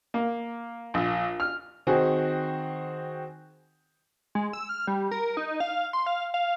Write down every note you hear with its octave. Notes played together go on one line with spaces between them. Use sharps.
A#3
A#1
F6
D#3 C4 F#4 G#4
G#3
E6
F6
G3
A#4
D#4
F5
C6
F5
F5